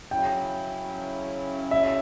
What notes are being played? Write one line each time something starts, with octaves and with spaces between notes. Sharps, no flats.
C#3 F#3 C#4 E4 G5
E5